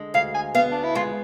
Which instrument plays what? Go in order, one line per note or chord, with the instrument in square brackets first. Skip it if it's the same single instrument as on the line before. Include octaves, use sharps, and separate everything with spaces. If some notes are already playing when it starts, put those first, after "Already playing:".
Already playing: [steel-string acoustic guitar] D3 G#3
[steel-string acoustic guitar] D2 [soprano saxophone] F5
[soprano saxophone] G#5
[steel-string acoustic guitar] B3 [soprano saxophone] F5
[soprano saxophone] D4
E4
[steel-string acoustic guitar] G#3 [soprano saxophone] F4